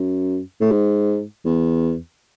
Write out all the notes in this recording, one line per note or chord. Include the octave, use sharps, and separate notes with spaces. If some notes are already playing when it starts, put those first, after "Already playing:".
Already playing: F#2
A2
G#2
E2